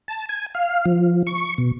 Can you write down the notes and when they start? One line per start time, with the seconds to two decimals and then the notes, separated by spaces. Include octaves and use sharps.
0.08 A5
0.29 G#5
0.55 F5
0.85 F3
1.27 C#6
1.58 B2